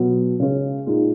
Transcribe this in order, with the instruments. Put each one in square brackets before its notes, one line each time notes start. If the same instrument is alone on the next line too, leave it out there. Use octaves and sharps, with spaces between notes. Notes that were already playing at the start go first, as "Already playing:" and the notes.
Already playing: [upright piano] B2 F#3 B3
C#3 G#3 C#4
A#2 G#3 D#4